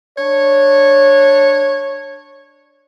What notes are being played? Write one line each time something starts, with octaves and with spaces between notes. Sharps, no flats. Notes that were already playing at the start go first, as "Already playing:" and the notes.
D4 C#5